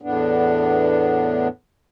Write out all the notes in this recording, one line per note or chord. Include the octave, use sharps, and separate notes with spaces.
E2 A2 B3 D4